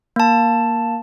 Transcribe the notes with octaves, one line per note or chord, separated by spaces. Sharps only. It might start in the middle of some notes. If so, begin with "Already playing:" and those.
A#3 A5